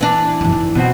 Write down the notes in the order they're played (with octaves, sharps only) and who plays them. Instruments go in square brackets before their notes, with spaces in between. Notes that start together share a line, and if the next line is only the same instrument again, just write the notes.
[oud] E3 D4
[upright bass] F#2 F3
D#4
[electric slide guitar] B2 C4 F#4 [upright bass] F#3